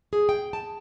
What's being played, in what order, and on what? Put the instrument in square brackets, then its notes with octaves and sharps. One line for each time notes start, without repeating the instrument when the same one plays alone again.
[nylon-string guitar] G#4
G5
A5